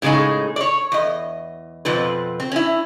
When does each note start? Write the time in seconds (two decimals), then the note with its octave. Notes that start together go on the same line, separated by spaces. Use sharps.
0.02 A2 C#3 G#3 D#4 G#4
0.56 C#5 D5
0.92 E2 D#5
1.85 F2 B2 F3 C4 B4
2.40 C4
2.52 C#4 E4